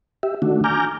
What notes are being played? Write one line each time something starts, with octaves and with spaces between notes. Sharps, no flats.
G4 E5
D#3 A3 D4 F#4
G#5 A#5 D6 F6 G6